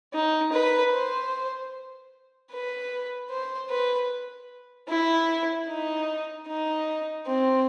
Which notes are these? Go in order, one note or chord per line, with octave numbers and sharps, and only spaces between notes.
D#4
B4
C5
B4
C5
B4
E4
D#4
D#4
C4